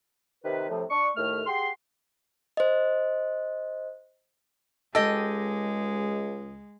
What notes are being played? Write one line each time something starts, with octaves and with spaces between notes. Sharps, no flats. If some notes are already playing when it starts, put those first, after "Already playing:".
C3 D#3 B4
A2 C3 F3
D4 C#6
D#2 A2 A3 F6
G4 G#4 F#5 G5 C6
C5 D#5
C#2 G#3 G4 A4 D#5